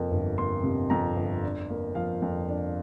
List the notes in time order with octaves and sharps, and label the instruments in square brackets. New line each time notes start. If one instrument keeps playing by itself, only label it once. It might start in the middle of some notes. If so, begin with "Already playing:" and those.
Already playing: [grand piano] F2 C3 A#3
G1
A#3 C6
C3
F2 A#5
G1
D4
A#3
F3 F5
F2
D4